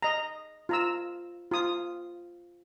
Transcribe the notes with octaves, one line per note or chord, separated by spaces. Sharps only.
D#5 A#5
F4 A#5 E6
F4 D#6